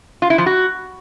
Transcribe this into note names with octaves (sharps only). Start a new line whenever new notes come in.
F4
E4
F3
F#4